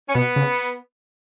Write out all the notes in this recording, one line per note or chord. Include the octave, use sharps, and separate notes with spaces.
C#4
B2 B3
C#3